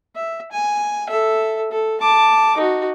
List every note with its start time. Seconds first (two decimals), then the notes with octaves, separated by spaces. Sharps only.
0.15 E5
0.52 G#5
1.09 A4 E5
1.71 A4
2.01 A5 D6
2.57 D#4 F#4